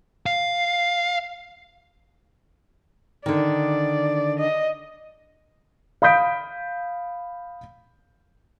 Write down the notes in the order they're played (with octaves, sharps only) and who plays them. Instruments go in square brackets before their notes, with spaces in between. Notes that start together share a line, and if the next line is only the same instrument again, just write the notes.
[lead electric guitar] F5
[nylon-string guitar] D3 D#3 [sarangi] D5
[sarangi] D#5
[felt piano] F5 B5 D#6 G6 B6 D7